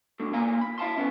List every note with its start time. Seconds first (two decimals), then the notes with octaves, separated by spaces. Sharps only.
0.20 A2 D3 A3
0.33 A#2 A#3 E4 G#5 A#5
0.61 B5
0.78 E4 F5 A5 C6
0.97 D2 B3 C#4 E4